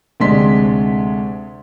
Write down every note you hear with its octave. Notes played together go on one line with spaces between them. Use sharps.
D2 C3 G#3 D4 C6 B6